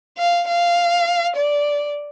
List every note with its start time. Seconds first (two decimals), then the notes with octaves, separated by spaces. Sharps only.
0.18 F5
0.48 F5
1.36 D5